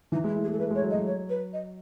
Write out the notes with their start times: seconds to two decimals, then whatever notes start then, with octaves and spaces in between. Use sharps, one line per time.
0.12 E3 D#4
0.24 G#3 E4
0.36 A3
0.44 G#4
0.48 G#3 A4
0.59 A3 B4
0.71 G#3 C#5
0.82 F#3
0.90 D#5
0.94 F#3
1.06 C#5
1.29 B4
1.53 D#5